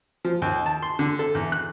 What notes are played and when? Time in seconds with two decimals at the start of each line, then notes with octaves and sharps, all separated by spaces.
0.25 F3
0.42 D#2
0.66 A5
0.82 C6
0.99 D3
1.19 A4
1.35 E2
1.52 F#6